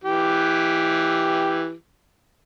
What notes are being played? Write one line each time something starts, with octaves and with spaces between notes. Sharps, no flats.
E3 G4